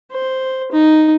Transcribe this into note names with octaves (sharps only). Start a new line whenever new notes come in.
C5
D#4